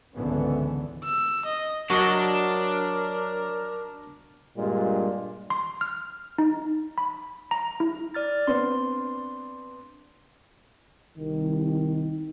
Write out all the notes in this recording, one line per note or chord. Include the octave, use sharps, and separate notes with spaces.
G#1 C#2 D3 E3 B3 C#4
E6
D#5
F#3 D4 F#4 A#4 D#5
G2 A#2 G#3
C6
F6
D#4
B5
A#5
E4
D5 F6 A6
B3 C4 D4 C6
C2 D#3